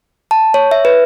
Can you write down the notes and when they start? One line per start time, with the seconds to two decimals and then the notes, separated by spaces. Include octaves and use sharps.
0.31 A5
0.54 C#5
0.71 E5
0.85 B4